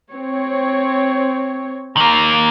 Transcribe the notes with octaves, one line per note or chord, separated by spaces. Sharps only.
C4 C#5
D#3 A#3 A#5